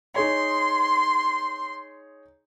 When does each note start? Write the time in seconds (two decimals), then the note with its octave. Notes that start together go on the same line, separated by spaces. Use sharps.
0.16 D#4 G#4 C#5 C6